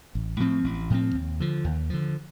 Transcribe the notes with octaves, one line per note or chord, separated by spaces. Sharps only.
A1
A2 F3 C4
A1
A2 F3 C4
D#2
D3 F3
D#2
D3 F3